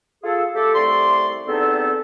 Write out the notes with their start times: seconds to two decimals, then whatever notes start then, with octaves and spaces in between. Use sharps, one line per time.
0.23 F4 G#4 A4
0.54 A3 G4 A4
0.75 C2 C3 A3 D5 C6
1.47 E2 G3 B3 C4 D#4 A4